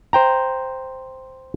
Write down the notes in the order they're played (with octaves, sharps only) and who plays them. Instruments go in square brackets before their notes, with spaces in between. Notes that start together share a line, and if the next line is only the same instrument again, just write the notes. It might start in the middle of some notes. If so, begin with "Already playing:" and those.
[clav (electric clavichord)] C5 G5 A#5